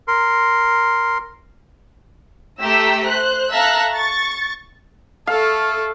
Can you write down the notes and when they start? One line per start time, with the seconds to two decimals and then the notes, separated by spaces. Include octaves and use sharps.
0.08 A#4 C6
2.62 A3 G4 A#5 E6 B6
3.06 C5 F#6
3.51 A4 E5 F5 A#5 E6 F#6
3.92 C#6 A6
5.27 A3 A4 F5